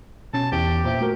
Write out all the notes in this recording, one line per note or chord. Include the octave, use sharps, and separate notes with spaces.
B2 C#4 A5
E2 E3 G4
A#2 C5 E5
A3 F#4 A#4